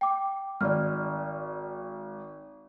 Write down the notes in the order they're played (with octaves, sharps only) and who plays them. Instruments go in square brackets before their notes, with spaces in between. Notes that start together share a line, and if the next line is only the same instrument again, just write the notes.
[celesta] G5 D6
[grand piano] G#1 [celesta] D5 F6